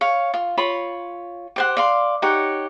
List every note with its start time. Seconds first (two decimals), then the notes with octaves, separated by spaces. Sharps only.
0.01 C#5 F5
0.34 F4
0.57 F4 C#5 B5
1.56 G4 C5 F#5
1.77 D5 F5 C6
2.22 D#4 G4 C#5 F#5